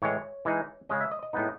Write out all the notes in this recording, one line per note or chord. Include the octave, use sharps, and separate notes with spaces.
A2 E3 G#3 C#5
E3 G#3 D#4
C#3 G#3 C#4 D#5
E5
D#5
D#5
A2 G#3 B3 D#4